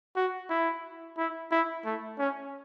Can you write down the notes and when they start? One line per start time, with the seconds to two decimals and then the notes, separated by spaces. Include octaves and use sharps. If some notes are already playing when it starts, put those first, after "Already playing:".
0.16 F#4
0.50 E4
1.17 E4
1.51 E4
1.85 A3
2.19 C#4